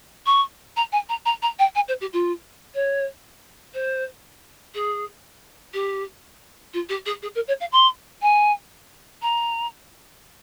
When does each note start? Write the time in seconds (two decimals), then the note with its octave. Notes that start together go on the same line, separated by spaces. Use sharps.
0.26 C#6
0.77 A#5
0.92 G#5
1.09 A#5
1.25 A#5
1.42 A#5
1.59 G5
1.75 G#5
1.88 C5
2.01 G4
2.13 F4
2.75 C#5
3.74 C5
4.75 G#4
5.74 G4
6.74 F4
6.89 G4
7.06 G#4
7.22 G#4
7.35 A#4
7.48 C#5
7.61 F5
7.72 C6
8.22 G#5
9.22 A#5